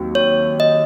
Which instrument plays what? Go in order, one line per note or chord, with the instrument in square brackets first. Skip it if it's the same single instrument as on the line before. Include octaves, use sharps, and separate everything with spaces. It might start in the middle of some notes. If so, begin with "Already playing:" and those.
Already playing: [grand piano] D#2 F#3 C4 F#4
[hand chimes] C#5
D#5